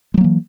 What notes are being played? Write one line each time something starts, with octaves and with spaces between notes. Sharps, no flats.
E3 F#3 G#3 A#3